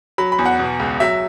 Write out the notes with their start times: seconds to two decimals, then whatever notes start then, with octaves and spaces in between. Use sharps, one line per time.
0.18 F#3 B5
0.32 B5
0.39 E2
0.46 F#5
0.59 B2
0.79 C#2
1.00 F#3 E5